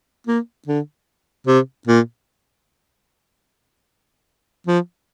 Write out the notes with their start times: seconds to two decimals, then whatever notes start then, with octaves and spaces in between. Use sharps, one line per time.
0.27 A#3
0.68 D3
1.47 C3
1.87 A#2
4.67 F3